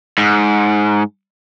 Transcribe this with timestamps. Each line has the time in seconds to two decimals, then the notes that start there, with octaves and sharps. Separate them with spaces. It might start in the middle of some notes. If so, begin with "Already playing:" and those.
0.18 G#2